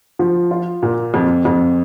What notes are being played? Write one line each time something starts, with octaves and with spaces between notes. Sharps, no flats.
F3
F4
A#2
F2
F2